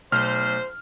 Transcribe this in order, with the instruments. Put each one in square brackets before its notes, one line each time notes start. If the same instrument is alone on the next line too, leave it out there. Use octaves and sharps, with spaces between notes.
[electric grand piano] B1 F6 [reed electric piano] B2 A3 [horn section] C5